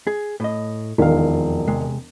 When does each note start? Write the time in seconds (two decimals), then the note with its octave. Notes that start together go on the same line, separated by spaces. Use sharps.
0.07 G#4
0.40 A2 D#5
0.98 E1 F2 D#3 F5
1.67 C3 G#3